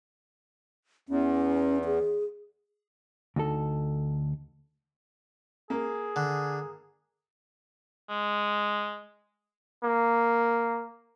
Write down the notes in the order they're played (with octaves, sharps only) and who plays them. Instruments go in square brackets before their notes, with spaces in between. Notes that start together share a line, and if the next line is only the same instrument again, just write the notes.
[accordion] E2 [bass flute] C#4
[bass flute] G#4
[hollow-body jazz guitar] D2 D#4 A4
[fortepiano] A#3 [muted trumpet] G#4
[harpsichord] D3
[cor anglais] G#3
[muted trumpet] A#3